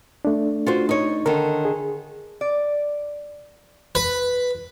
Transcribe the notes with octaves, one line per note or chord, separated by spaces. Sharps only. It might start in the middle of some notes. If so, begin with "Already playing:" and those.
A3 D4
F4 F#4 C5
D#4 C#5
D3 D#3 A#4
G#4
D5
B4